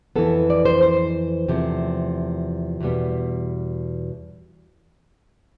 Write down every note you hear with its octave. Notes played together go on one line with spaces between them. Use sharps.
F2 E3 B3 A4
D5
C5
C5
E2 C3 F3 A3
E2 B2 G3 B3